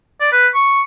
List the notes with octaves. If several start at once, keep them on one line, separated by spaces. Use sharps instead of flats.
D5
B4
C#6